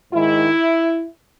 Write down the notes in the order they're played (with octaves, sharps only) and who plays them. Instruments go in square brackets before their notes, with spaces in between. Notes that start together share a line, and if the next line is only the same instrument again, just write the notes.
[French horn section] G#2 D#3 G#3 E4